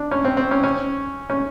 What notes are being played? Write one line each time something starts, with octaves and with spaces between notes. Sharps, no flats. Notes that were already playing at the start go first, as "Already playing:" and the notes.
Already playing: D4
C#4
C4
C4
C#4
C#4
C#4